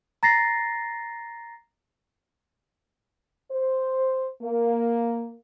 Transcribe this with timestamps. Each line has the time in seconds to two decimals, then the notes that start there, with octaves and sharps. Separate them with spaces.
0.23 A#5 A6 A#6 C7
3.51 C5
4.42 A#3